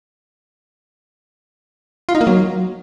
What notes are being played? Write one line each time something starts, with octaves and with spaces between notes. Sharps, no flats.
F4
D#4
A#3
F#3